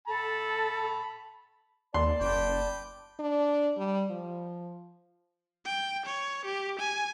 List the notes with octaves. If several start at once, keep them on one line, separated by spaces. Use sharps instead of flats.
A4 A5 B5
D#2 D5 A5 C6
F#1 B4 G5 D6
D4
G3
F3
G5
C#5
G4
G#5